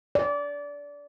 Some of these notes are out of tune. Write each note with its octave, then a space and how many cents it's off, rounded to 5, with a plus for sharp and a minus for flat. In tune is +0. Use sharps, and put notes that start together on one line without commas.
D5 -25